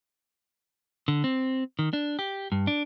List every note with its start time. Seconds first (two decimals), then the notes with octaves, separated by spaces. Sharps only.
1.08 D3
1.24 C4
1.79 D#3
1.93 D4
2.19 G4
2.52 G2
2.67 D4